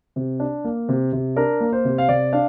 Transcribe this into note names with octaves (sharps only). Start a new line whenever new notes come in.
C3
D4
A#3
C3
C3
D4 A#4
A#3
C5
C3
F5
C3 D5
D4 F5